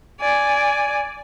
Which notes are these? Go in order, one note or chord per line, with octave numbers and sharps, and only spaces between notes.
D5 G#5